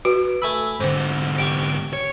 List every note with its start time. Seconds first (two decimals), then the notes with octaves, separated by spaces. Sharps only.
0.05 F#4 B4
0.42 A3 G#5 B5 E6
0.80 G#2 D3 C4
1.38 G4 G5 C#6 D7
1.93 C#5